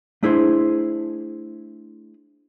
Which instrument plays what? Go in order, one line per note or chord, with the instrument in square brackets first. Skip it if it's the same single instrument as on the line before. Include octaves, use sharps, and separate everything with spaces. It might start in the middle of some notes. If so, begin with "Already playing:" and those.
[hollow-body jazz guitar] A3 D4 E4 G#4 C5